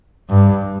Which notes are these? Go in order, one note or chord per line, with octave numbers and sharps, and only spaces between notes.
G2